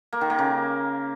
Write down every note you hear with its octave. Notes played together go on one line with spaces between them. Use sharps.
A#3
D#3
A#3
C#3